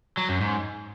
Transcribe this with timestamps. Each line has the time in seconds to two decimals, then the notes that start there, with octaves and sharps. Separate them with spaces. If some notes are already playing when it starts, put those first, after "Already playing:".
0.17 F#3
0.29 F#2
0.41 G#2